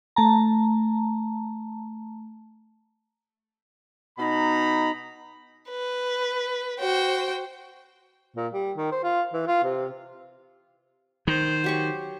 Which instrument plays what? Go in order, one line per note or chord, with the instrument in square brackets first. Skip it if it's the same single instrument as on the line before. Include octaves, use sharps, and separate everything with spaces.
[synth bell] A3 A5 A#5
[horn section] B2 D#4 A#5 B5
[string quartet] B4
F#4 C5 G5
[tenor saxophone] A#2
G3
D#3
C5
F4
E3
F4
C3
[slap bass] D#3 [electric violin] C5
[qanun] F#3 G4 C#6